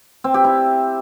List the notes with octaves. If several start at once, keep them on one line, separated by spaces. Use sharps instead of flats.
C4
G4
E4